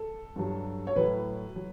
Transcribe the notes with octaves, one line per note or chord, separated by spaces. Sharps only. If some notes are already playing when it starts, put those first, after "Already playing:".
Already playing: A4
G2 F#3
C#5
A2 F#3 B4
F#3